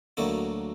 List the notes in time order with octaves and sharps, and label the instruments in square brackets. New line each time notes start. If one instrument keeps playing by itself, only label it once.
[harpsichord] D2 D3 F#3 A#3 E4